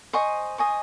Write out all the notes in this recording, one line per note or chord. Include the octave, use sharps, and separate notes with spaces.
C5 D#5 G#5 C#6
C5 D#5 G#5 C#6